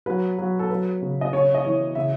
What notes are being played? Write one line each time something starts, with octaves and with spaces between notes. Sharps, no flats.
F#3 B4
F#3
A4
F#3 B4
C#3
D#5
C#3 C#5
D#5
E3 C#5
C#3 E5